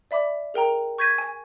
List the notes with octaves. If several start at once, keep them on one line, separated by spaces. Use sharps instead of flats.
D5 E5 B5 D6
G#4 A#4 G5 A#5
C#6 G6 G#6 A#6 B6 D#7
G#5